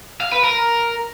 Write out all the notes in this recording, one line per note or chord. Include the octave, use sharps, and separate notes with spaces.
F5
B4
A#4